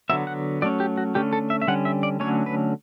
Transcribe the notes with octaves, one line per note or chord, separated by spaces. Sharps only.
D3 F#3 B3 E5
F#5
F#3 A3 C#4 D5
G4
F#4
D3 A3 C#4 G4
A4
E5
E5
D3 G3 C#4 F#5
E5
D5
D3 F#3 A3 C#4 C#5
B4